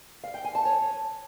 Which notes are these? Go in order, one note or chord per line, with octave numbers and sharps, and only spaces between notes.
F5
G5
G#5
A5
C#5